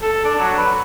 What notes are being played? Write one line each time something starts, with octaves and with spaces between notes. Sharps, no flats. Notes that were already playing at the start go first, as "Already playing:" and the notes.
A4
D4
F#3
B4